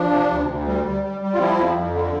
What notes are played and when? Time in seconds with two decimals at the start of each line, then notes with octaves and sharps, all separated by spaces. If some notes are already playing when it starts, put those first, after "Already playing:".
Already playing: F3 D4
0.12 C3
0.30 D2
0.48 D2
0.67 G3
0.84 G3
1.04 G3
1.22 G3
1.34 F4
1.39 F3 C4 E4
1.58 F2
1.75 F2
1.94 D3